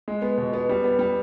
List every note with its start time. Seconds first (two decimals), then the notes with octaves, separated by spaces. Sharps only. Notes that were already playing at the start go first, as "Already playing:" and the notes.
0.08 G#3
0.22 B3
0.38 B2
0.53 B3
0.69 G3
0.84 B3
0.99 G3